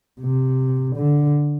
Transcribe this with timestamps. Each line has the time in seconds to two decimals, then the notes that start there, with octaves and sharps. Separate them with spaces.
0.21 C3
0.96 D3